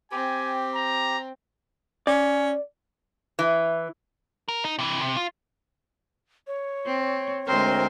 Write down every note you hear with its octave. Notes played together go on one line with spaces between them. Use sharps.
C4 G4 G#5
A#5
C#4 D5
E3
A#4
D#4
C3 E3
C3
F4
C#5
C4
D2 G#3 C4 A#4 C5